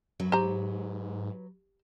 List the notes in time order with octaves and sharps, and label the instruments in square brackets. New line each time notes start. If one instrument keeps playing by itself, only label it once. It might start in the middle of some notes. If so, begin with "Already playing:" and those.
[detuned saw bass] F#2 [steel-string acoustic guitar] F#3 B4
[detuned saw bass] G#2 [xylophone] G4 [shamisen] C5 A#5